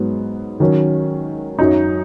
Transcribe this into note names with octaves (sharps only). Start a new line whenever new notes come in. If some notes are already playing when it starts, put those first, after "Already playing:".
Already playing: G#2 F#3 B3
D#3 F#3 C#4
F#2 F#3 D#4